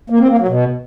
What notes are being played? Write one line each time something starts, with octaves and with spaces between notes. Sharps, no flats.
A#3
C4
A#3
F#3
B2